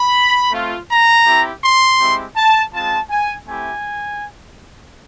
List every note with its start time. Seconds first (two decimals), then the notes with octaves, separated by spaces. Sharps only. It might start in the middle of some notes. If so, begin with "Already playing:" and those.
Already playing: B5
0.52 A3 C4 F4
0.89 A#5
1.26 C4 E4 G4
1.63 C6
1.99 G#3 C4 E4 G4
2.36 A5
2.73 G#3 C4 F4 A5
3.10 G#5
3.47 A3 C4 E4 G4 G#5